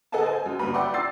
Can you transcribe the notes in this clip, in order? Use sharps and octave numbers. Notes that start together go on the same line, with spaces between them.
G#4 A4 D#5 F#5 G#5 A5
C5 G#5
F#2
D2 G2 A#3 B4 B5
D5 E5 F#5 G5 C6 D6
E6 A6 C7